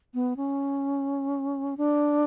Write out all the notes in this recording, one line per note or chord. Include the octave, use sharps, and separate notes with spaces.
B3
C#4
D4